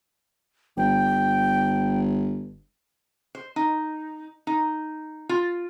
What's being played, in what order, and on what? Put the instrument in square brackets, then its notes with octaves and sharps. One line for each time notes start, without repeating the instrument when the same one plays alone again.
[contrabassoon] G1 [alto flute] G5
[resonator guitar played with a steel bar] C5
D#4
D#4
F4